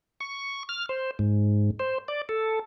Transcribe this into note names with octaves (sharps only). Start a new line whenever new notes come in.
C#6
F6
C5
G#2
C5
D5
A4